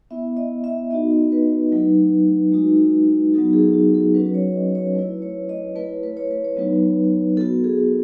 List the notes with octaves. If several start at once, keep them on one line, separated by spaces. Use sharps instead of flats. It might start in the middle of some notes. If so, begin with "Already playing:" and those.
B3 E4 E5
D#5
E5
B3 D#4 F#4 D#5
B4
F#3 A3 D#4
G#3 D#4 F#4
F#3 B3 D#4 F#4 A4
G#4
F#4
A4
F#3 C#4 F#4 B4
B4
C#5
D#5
C#5
A3 E4 B4
C#5
D#5
A3 E4 B4
C#5
B4
C#5
B4
C#5
F#3 B3 D#4 B4
B3 F#4 A4
G#4